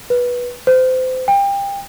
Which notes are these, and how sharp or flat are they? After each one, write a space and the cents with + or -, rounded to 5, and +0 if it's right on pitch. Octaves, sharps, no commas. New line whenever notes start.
B4 -15
C5 -30
G5 +25